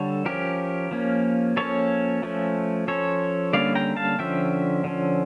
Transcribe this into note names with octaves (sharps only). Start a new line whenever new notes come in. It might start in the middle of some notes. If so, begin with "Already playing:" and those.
Already playing: D3 G3 A4 C#5
F3 C#4 G4 A#4
F3 A#3 C#4
F3 A#3 C#4 A4 C#5
F3 A3 C#4
F3 C#4 A4 C#5
D3 G3 A#3 C#4 D5 F5
G5 A#5
F5 A5
D3 F3 C#4 E5 G5
D3 F3 C#4